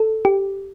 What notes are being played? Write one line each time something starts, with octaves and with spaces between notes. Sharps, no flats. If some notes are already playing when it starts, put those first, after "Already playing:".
Already playing: A4
G4